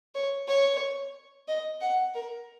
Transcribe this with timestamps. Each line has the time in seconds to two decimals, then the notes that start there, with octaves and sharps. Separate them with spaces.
0.15 C#5
0.48 C#5
1.48 D#5
1.81 F#5
2.14 A#4